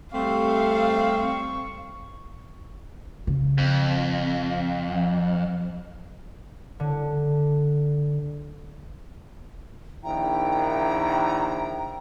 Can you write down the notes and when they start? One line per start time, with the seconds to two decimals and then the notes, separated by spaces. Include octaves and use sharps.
0.13 G3 A3 C4 F5 C#6
3.27 C#3
3.58 F2
6.80 D3
10.04 A#1 D#3 E4 G5 A#5